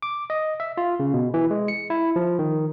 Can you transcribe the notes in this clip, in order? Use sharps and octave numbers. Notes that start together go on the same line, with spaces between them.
D6
D#5
E5
F4
C#3
B2
E3
G#3
C#7
E4
F3
D#3